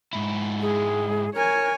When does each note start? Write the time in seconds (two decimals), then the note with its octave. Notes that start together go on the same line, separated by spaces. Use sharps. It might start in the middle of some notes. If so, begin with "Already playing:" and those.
0.13 G#2 E4
0.61 G#3 G#4
1.35 A#4 C#5 G#5